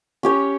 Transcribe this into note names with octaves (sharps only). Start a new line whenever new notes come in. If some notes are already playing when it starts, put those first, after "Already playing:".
C#4 G4 C#5